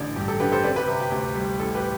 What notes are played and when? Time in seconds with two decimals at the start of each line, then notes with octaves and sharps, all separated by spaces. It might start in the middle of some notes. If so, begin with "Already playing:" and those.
Already playing: A1 D3 D5
0.16 G2 G4
0.28 A4
0.40 D3 G4 B4
0.52 A4 C5
0.64 C4 B4 D5
0.76 G4 B4
0.88 C3
1.00 G4
1.11 D2 G4
1.35 G3
1.59 A1 A4
1.75 G4 B4